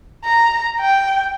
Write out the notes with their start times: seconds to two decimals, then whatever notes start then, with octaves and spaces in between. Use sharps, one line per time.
0.25 A#5
0.80 G5